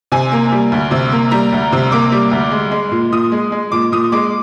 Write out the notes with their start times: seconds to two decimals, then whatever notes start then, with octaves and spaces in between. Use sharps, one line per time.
0.12 C3 G#5
0.32 A#3
0.52 G3
0.72 D2
0.91 C3
1.11 A#3
1.31 G3 A#5
1.52 D2
1.72 C3
1.92 A#3 D6
2.12 G3
2.31 D2
2.51 G#3
2.71 G#3
2.91 A#2
3.12 A#2 D#6
3.32 G#3
3.52 G#3
3.72 A#2 D6
3.92 A#2 D#6
4.12 G#3 D6